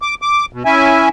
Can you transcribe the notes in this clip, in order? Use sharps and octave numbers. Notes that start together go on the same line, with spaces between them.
D6
D6
B2
C#4 E4 E5 G#5